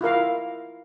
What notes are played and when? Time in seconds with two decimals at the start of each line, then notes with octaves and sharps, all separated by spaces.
0.01 E4 F4 A#4 F5